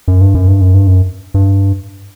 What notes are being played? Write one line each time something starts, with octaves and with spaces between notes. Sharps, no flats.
F#2
G2
F#2
G2
F#2
G2
F#2
G2